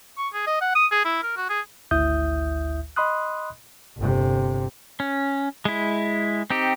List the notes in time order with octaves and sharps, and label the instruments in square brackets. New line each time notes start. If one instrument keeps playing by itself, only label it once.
[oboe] C#6
G#4
D#5
F#5
D#6
G#4
E4
A#4
F#4
G#4
[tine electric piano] G#1 D2 E4 E5 D#6 G6
D#5 B5 C6 D#6 F#6
[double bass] G1 C3
[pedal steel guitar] C#4
G#3 E4
C4 D#4 G4